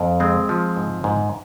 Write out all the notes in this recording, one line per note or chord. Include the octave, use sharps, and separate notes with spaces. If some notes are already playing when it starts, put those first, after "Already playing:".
Already playing: F2
G#3 C4
F3
G#2
G#2